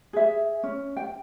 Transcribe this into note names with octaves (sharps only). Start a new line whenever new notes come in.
G#4 E5
C#4
G5